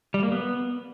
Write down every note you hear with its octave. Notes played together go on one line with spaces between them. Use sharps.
G3
A#3
B3